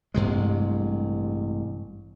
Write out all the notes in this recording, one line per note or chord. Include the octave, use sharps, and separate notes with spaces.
A1 G2 C3 G#3